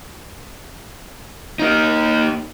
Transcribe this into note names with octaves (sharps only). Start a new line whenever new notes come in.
A#3 D#4